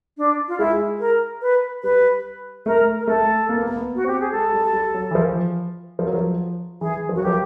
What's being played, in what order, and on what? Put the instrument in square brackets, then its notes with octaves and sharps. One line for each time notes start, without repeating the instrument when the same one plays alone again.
[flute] D4
F4
[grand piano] G#3 [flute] E4
[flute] A#4
B4
[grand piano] G3 [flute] B4
[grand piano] A3 [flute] A#4
[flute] A#4
[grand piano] A3 [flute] A4
[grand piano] A#3
B3
A#3
B3
[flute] F#4
[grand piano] C4 [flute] G4
[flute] G#4
[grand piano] G#3 [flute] A4
[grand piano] G3
G3
F#3
E3
F3
F3
F#3
F3
[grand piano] E3 [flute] G#4
[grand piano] F3
[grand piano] F#3 [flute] F#4
[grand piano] F3 [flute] G4